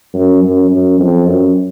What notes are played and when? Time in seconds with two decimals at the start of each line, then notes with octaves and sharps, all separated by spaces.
0.14 F#2
0.43 F#2
0.70 F#2
0.99 F2
1.27 F#2